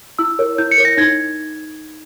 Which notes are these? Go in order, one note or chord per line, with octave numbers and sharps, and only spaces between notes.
E4 E6
A#4 C#5
E4 G6
C#7
A#4 C#5
A#6
D#4 G#6